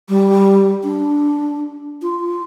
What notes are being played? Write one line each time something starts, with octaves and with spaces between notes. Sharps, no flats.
G3
D4
F4